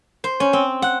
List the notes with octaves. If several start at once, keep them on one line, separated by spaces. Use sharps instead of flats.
C5
C#4
C4
F#5